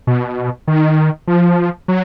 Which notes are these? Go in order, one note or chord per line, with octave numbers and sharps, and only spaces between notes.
B2
D#3
F3
F#3